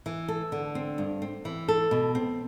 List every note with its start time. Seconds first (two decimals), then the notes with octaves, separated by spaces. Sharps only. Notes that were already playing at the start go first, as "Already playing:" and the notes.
0.06 E3
0.28 A4
0.52 D3
0.75 C4
0.98 G2
1.22 C4
1.45 E3
1.68 A4
1.91 B2
2.15 C4